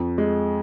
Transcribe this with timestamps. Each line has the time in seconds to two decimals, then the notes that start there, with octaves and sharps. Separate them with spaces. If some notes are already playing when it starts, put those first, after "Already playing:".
Already playing: F2
0.18 G#3